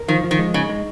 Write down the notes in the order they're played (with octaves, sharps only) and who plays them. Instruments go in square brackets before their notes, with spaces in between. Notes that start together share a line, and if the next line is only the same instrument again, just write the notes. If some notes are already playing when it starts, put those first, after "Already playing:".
Already playing: [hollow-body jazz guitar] A#4
[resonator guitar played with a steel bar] D#3 [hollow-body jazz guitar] F3
[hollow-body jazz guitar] F3
[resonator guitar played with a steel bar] D#3
[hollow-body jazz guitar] G#3
[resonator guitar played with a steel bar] C#3 [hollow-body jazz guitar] D#4
[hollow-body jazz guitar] G#3